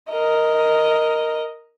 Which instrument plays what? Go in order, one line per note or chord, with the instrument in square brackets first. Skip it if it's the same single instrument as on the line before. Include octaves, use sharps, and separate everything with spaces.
[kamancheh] A#4 D#5